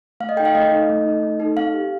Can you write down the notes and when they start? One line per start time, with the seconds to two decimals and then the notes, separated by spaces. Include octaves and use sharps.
0.20 A3 F5
0.29 D#5
0.37 D#4 A4 G5
0.45 F5
0.55 A3 D#5
0.71 D#4 A4
0.89 A3
1.06 D#4 A4
1.23 A3
1.40 D#4 A4
1.57 C4 F5
1.74 G4